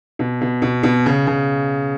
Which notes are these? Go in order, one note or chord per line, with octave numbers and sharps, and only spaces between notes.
B2
B2
B2
B2
C#3
C#3